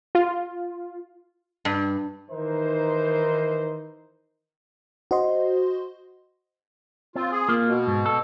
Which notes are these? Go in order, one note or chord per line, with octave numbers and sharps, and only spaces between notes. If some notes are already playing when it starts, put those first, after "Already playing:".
F4
G2
D#3 E3 D#4 A#4 C5
F#4 C5 D#5 C6
C4 F4
G#4
A#3 F4
B2
G#2
A4